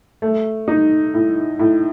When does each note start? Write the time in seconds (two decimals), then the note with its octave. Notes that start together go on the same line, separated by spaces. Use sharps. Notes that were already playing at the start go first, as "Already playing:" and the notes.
0.22 A3
0.68 D#4
1.14 A2
1.59 A2